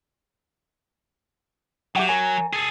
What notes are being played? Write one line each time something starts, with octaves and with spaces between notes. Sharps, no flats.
F#3 G4 E5 F#5
A#4 C#5 G#5
G#4 A4